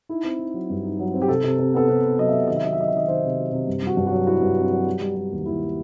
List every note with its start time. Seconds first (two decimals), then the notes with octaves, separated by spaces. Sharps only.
0.09 D#4 E4
0.24 C4
0.39 D#4
0.54 F#3
0.70 G2
0.84 D#4
0.99 F#3
1.14 C4
1.22 G4
1.28 C3 A4
1.44 C3
1.58 C3
1.74 B3 A4
1.88 C3 B4
2.03 B3
2.18 F#3 D#5
2.28 E5
2.33 C3
2.47 D#3 D#5
2.56 E5
2.63 F#3 D#5
2.73 E5
2.77 F#3 D#5
2.88 E5
2.93 D#3 D#5
3.08 D#3 C5
3.23 C3
3.38 F#3
3.52 C3
3.67 G2
3.82 G2 F#4
3.97 G2
4.07 F#4
4.12 F#3
4.27 E4 F#4
4.42 G2
4.57 C4
4.72 F#3
4.86 G3
5.01 G3
5.16 G3
5.31 D#2
5.46 D#2 E4